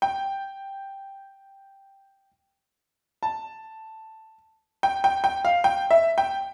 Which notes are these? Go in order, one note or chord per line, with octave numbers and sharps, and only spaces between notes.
G5
A5
G5
G5
G5
F5
G5
E5
G5